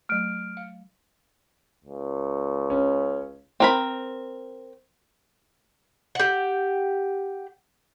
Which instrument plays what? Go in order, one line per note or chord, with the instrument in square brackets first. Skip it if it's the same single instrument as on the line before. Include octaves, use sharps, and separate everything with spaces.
[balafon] F#3 A3 [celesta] F6 D7
[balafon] F5
[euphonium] C#2
[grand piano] C#4
[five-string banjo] C4 A#4 B5
[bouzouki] G4 F#5